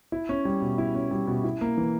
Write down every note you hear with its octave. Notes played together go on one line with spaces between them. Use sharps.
E4
C#4
G3
B2
E4
C#4
G3
B2
E4
A#3
E3